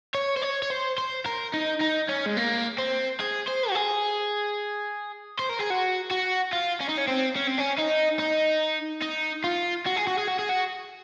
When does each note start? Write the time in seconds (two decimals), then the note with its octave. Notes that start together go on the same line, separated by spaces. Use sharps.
0.15 C#5
0.37 C5
0.42 C#5
0.63 C#5
0.70 C5
0.98 C5
1.26 A#4
1.54 D#4
1.81 D#4
2.09 C#4
2.26 G#3
2.37 A#3
2.79 C4
3.20 G#4
3.48 C5
3.70 F#4
3.75 G#4
5.39 C5
5.49 A#4
5.59 G#4
5.70 F#4
6.11 F#4
6.53 F4
6.81 C#4
6.89 D#4
6.98 C#4
7.08 C4
7.36 C#4
7.47 C4
7.58 C#4
7.78 D#4
8.19 D#4
9.02 D#4
9.44 F4
9.86 F#4
9.96 G#4
10.07 F#4
10.18 G#4
10.28 F#4
10.39 G#4
10.49 F#4